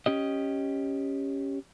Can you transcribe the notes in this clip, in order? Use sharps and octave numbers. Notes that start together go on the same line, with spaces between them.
C#4 G4 D#5